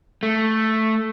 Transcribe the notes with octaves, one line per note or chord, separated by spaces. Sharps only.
A3